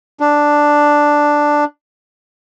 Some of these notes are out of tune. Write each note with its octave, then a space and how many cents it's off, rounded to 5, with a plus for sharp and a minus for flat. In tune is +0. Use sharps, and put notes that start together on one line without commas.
D4 +5